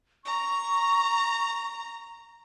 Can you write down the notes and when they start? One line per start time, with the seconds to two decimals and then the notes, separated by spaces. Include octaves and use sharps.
0.25 A#5 C#6